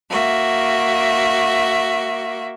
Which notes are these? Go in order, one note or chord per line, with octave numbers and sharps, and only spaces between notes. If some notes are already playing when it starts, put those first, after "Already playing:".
A#3 F#4 E5